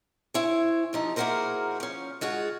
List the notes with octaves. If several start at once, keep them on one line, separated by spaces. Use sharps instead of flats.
E4 C5 C#5 G#5
C3 F3 D#4
A#3 E4 F#4 G#4 A#4 C5
F3 C#4
G#3 F4 F#4 G#4